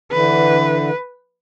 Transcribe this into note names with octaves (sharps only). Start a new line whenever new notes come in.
D3 E3 B4